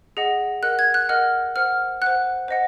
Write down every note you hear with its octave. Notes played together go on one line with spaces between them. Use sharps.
G#4 D#5 F#5
A#4 D#5 F#5 F#6
G#6
F#6
A#4 D#5 F#5 F6
C5 F#5 F6
C5 F#5 F#6
C5 D#5 F#5